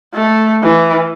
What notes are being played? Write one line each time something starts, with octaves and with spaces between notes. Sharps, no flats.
A3
E3